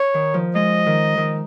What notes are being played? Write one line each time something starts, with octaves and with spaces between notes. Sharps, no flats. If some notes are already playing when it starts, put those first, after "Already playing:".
Already playing: C#5
D#3
F3
G#3 D#5
D#3
D#3